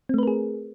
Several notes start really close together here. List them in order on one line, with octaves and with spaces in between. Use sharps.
C4 A3 B4 A#4 G#4